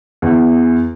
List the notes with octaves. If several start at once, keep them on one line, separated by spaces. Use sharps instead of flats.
E2